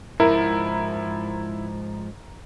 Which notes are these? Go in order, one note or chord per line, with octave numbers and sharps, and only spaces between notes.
G#2 F3 E4 A#4